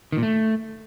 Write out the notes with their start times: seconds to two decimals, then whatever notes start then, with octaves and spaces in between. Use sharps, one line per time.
0.12 D#3
0.18 A#2
0.23 A3